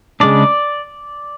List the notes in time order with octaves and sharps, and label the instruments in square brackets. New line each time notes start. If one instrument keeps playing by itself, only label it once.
[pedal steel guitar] C#3 G#3 D4 D5